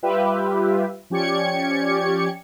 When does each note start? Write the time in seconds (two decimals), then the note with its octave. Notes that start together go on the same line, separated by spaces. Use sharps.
0.03 G3 F4 G4 B4 E5
1.10 F3 C#4 G4 D5 G#6 C#7